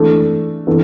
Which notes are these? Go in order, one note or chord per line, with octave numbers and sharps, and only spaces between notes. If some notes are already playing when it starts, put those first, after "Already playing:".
Already playing: E3 A3 D4 A4
E3 B3 D4 A4